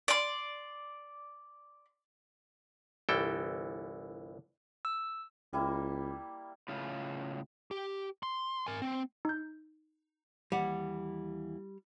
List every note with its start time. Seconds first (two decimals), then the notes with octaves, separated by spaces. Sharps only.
0.08 D5 C6
3.09 G1 C2 E3 A4 G5
4.85 E6
5.53 C#2 G3 A#3 E4
6.68 A2 C#3 F4
7.71 G4
8.23 C6
8.67 A#4 G#5
8.82 C4
9.25 D#4 G6
10.52 D#2 E3 G3 F#5